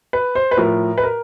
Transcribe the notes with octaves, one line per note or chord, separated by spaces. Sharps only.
B4
C5
B4
A2 F3 A#4
B4
A#4